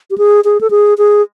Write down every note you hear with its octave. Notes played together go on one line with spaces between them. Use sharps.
G4
G#4
G#4
A4
G#4
G#4